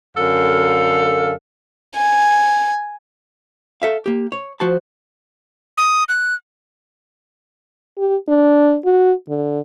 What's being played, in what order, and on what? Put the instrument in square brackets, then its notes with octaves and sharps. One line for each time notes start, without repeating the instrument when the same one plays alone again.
[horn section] F#2 D3 A4 F5
[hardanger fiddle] G#5
[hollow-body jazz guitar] A4 E5 F5
A#3 G4
C#5
F3 F#4 C5 A5
[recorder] D#6
F#6
[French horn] G4
D4
F#4
D3